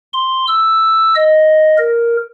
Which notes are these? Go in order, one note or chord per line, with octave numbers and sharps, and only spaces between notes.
C6
E6
D#5
A#4